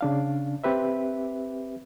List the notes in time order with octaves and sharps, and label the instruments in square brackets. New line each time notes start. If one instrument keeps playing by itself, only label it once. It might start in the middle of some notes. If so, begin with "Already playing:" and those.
[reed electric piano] C#3 D4 F5
C4 G4 B4 E5